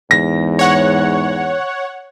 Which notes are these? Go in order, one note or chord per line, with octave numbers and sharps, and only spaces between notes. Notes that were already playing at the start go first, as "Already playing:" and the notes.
E2 G#2 A#6
C#5 F#5